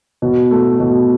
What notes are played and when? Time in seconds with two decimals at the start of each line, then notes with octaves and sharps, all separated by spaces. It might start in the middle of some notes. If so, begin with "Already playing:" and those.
0.22 B2
0.51 A3
0.80 B2